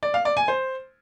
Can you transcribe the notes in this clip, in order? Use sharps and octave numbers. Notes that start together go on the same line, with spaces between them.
D5
F5
D5
G#5
C5